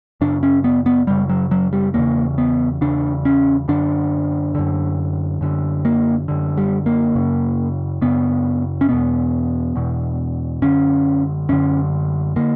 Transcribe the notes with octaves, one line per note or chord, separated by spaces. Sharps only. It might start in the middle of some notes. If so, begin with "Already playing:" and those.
F#2 C#3 D4
C#4
B3
B3
F#2 C#3 G3
F#3
F#3
G3
E2 C#3 A#3
B3
E2 C#3 D4
C#4
F#2 D3 D4
F#2 D3
F#2 D3
A#3
F#2 D3
G3
A#3
F#2 C#3
F#2 C#3 B3
C#4
E2 B2 B3
E2 B2
F#2 D3 C#4
F#2 D3 C#4
D3 A#3